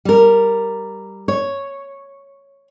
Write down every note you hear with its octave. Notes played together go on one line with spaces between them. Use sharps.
G3 A#4
C#5